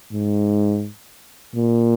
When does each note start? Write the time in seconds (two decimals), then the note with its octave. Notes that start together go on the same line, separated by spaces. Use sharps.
0.12 G#2
1.56 A#2